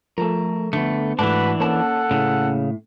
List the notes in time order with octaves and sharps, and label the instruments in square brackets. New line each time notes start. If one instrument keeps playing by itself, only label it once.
[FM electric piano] F3 A4 [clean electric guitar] A3 A#4
[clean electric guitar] D3 B3 [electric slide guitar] A3
[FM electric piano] G#2 A3 [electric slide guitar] E3 D4 [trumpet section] F#4 B4 [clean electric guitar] A5
[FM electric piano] A#3 C#4 [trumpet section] A4 F#5 [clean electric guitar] C#5 A5
[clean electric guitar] A2 [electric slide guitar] C#3